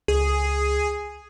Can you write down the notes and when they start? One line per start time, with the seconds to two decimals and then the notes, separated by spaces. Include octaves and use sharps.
0.08 C#2 G#4